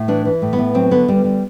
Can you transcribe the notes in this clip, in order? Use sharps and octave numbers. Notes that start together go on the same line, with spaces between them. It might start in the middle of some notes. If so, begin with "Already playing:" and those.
Already playing: A2
E3 D4
E3
A2
B3
A2
F#3 C4
D3 B3
D3 G3
G3